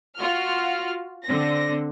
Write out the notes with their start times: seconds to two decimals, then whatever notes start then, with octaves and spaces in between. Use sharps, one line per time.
0.17 F4 F#4 F6
1.25 D3 C4 A#6